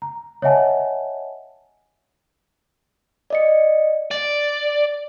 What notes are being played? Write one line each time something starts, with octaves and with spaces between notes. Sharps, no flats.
A#5
C#5 D#5 E5 F#5 G#5 A5
D5 D#5 C#7
D5